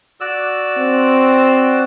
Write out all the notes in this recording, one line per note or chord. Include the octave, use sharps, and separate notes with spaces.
F#4 D5 E6
C4